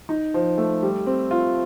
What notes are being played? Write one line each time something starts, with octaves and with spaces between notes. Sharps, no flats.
D#4
F3
A3
G3
C4
F4